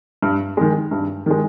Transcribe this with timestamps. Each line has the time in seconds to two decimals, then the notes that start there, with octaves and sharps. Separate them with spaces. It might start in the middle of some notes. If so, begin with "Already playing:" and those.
0.22 G2
0.57 D#3 G#3
0.91 G2
1.26 D#3 G#3